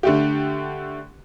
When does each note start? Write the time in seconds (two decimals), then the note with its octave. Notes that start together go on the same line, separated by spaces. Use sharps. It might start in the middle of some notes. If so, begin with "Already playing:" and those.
0.03 D3 A3 G4